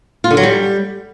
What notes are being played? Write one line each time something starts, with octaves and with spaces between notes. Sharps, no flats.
F4
D3
F#3
G3